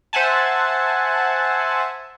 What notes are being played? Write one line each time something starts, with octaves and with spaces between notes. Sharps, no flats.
C5 E5 F#5 G#5 A5